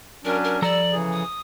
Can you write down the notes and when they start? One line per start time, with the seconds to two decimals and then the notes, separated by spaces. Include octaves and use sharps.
0.25 F#3 C#4 D4 A#4
0.44 A#4
0.62 F3 G3 A4 D5 A#5 E6
0.92 C#3 E3 G#4
1.12 D#6